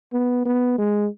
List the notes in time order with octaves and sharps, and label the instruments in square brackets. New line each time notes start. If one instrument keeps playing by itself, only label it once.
[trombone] B3
B3
G#3